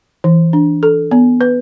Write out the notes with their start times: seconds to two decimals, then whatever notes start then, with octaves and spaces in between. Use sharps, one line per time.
0.24 E3
0.53 D4
0.83 A4
1.11 B3
1.41 B4